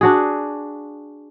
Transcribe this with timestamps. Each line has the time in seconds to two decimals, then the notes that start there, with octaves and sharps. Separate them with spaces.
0.01 D4 F#4 G#4